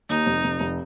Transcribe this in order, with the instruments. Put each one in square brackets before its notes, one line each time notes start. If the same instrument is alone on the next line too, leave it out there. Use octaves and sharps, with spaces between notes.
[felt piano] D#2 [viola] D#4
[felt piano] F1
F1
F1